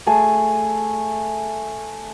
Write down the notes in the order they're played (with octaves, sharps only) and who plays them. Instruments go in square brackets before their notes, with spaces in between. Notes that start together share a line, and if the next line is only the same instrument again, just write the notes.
[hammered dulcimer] A3 G#4 G#5 A5